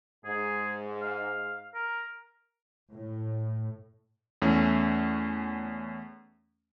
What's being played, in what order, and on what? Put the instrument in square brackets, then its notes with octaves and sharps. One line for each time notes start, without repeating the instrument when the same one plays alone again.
[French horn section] G#2 [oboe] G#4
[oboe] F5
A#4
[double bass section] A2
[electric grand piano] E2 A3 C#4